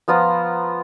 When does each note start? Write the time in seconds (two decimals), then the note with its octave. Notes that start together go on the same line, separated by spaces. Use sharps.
0.08 F3 B3 F4 A#5